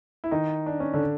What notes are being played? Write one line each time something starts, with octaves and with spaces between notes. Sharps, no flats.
E4
D#3 D#4
D4
C#4
D3 D4